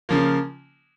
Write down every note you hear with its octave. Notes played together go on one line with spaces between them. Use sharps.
C#3 F3 A#3